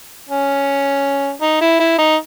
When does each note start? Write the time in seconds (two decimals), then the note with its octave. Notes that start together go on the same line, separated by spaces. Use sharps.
0.29 C#4
1.42 D#4
1.61 E4
1.80 E4
1.98 D#4